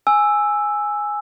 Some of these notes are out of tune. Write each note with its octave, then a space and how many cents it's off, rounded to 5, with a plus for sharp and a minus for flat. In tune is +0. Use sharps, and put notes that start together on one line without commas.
G#5 +0 E6 +0